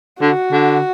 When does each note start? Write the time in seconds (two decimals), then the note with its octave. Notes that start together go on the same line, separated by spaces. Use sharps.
0.21 D3 F#4
0.52 D3